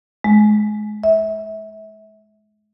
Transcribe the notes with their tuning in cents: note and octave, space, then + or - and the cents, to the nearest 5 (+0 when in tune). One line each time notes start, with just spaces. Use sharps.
G#3 +30
E5 -25